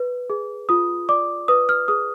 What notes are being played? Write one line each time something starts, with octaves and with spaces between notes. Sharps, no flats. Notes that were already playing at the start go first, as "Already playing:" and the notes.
Already playing: B4
G#4
F4 D#6
D5 D6
B4 D#6
F6
G#4 D#6